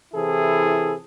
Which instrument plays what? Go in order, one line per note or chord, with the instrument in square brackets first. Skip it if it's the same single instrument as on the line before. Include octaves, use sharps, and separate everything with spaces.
[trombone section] C3 E3 E4 G#4 A4